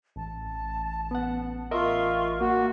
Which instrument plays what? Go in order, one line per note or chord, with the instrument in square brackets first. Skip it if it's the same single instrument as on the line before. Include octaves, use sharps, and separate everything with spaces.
[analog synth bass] A1 [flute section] A5
[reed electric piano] B3 F#5
[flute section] F4 C6 C#6 [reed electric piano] A#4 D#5 E5
[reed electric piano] A#3 [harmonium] F#4